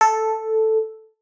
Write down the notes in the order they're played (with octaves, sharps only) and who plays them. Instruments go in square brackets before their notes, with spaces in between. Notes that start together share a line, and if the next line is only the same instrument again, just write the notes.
[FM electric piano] A4